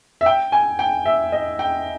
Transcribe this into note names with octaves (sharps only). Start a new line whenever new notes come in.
E5
G5
G#5
G5
E5
D#5
G5